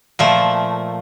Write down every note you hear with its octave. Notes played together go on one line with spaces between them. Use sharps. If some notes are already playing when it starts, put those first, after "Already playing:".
A#2 F3 A3